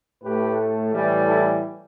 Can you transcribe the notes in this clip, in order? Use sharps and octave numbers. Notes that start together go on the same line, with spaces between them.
A2 A3 G4 B4
A2 E3 G3
E4 A4